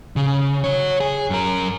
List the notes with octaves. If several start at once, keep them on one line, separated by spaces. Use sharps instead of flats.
C#3
F#4 C#5
G#4
F#2 A#4